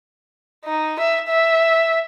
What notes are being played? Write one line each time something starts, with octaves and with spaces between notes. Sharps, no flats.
D#4
E5
E5